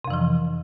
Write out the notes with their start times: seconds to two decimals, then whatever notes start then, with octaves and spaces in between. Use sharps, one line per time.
0.05 C3
0.07 F2
0.10 E3
0.13 F3